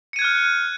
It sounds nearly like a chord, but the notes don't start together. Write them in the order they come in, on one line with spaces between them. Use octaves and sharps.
C#7 D#7 G#6 F#6 F6